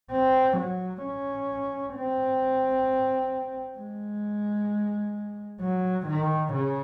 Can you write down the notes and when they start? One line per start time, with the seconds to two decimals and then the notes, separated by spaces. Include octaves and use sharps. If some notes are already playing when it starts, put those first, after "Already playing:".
0.12 C4
0.57 F#3
1.03 C#4
1.95 C4
3.78 G#3
5.61 F#3
6.07 D#3
6.53 C#3